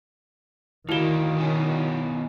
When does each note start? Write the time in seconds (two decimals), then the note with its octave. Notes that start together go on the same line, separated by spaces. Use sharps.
0.89 D2 D#3 A#3 E4 F#4
1.38 B2 C#4